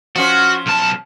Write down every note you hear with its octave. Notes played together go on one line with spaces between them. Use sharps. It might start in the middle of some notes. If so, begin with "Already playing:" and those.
F3 C#4 F#4 C5
B1 A5